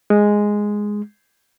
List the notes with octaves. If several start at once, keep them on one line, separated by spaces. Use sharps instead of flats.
G#3